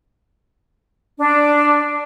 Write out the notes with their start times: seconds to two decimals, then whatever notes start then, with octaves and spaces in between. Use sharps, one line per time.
1.18 D4